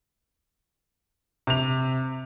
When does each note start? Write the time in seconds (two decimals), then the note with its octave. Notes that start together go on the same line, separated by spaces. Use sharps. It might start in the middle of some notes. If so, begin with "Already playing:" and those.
1.47 C3 F7